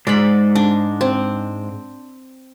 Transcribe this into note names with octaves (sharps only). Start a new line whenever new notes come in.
G#2 G#3 D5 B5
D4
C4